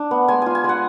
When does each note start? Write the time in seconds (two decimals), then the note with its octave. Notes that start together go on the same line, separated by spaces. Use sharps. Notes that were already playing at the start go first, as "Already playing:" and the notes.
Already playing: D4
0.11 B3
0.28 G#3 G#5
0.42 F4 G#5
0.55 G#5
0.64 G#3 F#5